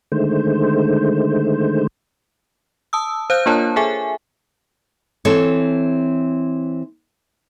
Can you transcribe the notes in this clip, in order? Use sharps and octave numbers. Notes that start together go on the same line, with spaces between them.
D3 D#3 G#3 A3 C5
A5 D#6 E6
C5 F5 F#6 G6
A#3 D4 F4 A#4 C#5 A5
G#4 A4 E5 G#5
E3 C4 A4 C#5